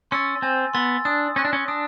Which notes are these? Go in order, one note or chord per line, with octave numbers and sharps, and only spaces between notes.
C#4 C6 E6 A6
C4 G#5
B3 C6 E6 A6
D4 D#6
C#4 F#6 A#6
D4
C#4
D4 D#6